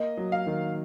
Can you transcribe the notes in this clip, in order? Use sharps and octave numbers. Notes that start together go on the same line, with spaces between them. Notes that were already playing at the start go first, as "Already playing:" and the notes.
Already playing: A#3 D#5
F#3
F5
D#3